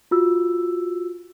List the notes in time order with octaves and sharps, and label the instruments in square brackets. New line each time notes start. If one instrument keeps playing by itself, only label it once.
[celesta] F4 F#4 E6